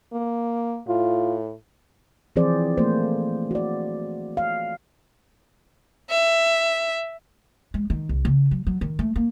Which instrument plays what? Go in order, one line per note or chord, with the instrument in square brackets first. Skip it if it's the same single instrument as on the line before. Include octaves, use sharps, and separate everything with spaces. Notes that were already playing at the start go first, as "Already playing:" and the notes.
[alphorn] A#3
[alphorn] A2 [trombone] F4
[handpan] E3 F3 C4 G#4 C5 D5
A3 A#3 C5
F#4 D5
F5
[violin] E5
[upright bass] G#3
D#3
C2
C#3
F#3
F#3
D#3
A3
A#3